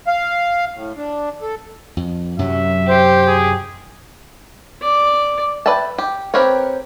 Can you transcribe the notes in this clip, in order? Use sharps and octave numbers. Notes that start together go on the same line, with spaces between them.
F5
A2
D4
A4
F2
F#2 C3 F#3 E5
G4 C5
G#4
D5
B4 D5 E5 G5 A5
G4
C4 G4 A#4 B4 C#5